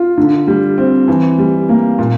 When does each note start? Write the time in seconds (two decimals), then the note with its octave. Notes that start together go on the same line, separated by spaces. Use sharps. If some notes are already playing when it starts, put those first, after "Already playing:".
Already playing: F4
0.17 D3
0.47 G3
0.78 C4
1.08 E3
1.38 G3
1.69 A#3
1.99 A#2